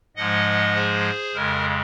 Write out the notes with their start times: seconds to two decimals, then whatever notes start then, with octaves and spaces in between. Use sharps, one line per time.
0.16 G#2 F3 G#3 D#5 F#5
0.75 G#4 C5
1.34 F2 C#3 G#3 A#4